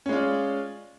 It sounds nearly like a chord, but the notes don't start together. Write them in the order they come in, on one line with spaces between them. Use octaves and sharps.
C#4 G#3 F4 D5